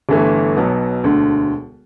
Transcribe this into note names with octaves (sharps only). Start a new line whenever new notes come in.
G1 G2 E3 A3
B1 B2 F#3 B3
E1 D2 D3